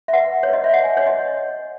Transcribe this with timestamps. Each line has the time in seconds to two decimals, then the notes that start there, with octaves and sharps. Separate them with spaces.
0.08 E5
0.13 B4 F#5
0.43 C#5
0.48 B4 D#5
0.64 E5
0.74 F#5
0.83 B4 G#5
0.97 C#5
1.06 D#5